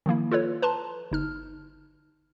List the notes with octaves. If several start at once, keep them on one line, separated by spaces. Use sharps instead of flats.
D#3 F3 A#3 E4
F4 A4 B4 C#5
B4 A5 A#5 C6
G1 D#4 F6